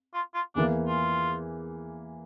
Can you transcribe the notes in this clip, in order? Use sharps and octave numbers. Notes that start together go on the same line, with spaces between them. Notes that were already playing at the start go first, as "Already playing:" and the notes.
F4
F4
E2 E3 A#3 D4
F4